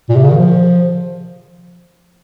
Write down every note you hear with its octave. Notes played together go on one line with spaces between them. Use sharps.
A#2
C3
C#3
D#3
F3